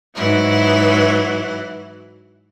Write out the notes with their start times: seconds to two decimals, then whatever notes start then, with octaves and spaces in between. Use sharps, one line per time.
0.15 G#2 E3 F#3 E4